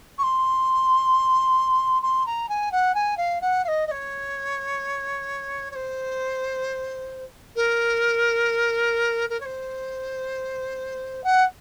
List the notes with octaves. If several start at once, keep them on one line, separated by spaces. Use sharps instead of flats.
C#6
C6
C6
A#5
G#5
F#5
G#5
F5
F#5
F5
D#5
D#5
C#5
C#5
C5
A#4
A#4
C#5
C5
F#5